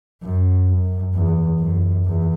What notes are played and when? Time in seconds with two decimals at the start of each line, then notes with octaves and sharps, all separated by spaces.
0.23 F#2
0.69 F#2
1.15 E2
1.60 F#2
2.06 E2